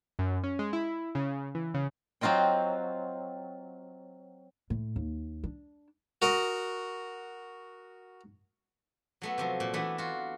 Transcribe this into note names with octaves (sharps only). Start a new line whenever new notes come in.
F#2
C#4
G#3
E4
C#3
E3
C#3
F#3 C4 F4 D#5 G5
A2
D#2
D4
F#4 A#4 D#5
F#3 A3 B3
C3 F3 F#3
A#2
E3 A3 B3 D4
F4 F#4